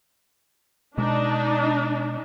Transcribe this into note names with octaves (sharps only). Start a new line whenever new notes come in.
B2 G#3 D4 D#4